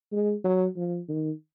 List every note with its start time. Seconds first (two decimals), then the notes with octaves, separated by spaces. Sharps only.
0.12 G#3
0.44 F#3
0.77 F3
1.08 D#3